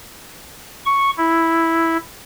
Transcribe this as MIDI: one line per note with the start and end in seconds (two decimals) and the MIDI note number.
0.86 1.10 85
1.17 1.97 64